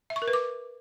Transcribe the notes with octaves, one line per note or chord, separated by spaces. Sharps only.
E5
C#6
A#4
B4
D6